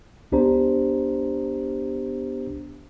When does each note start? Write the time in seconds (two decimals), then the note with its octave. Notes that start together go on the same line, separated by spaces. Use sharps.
0.32 C#2 B3 D4 G4 C5 A#5